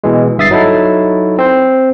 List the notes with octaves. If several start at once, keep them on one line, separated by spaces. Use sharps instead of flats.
B2 E3 G#3
G1 G2 E5 D#6 A6 C7
F#3 D#4 E4 A4
C4 C5